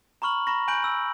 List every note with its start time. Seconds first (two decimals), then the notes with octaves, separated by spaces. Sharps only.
0.22 A#5 B5 C#6 F6 F#7
0.47 A#5 B5 C#6 A#6
0.68 G#5 B5 F#6 G6 D7 F#7
0.84 E6